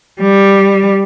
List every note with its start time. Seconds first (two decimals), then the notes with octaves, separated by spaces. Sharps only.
0.21 G3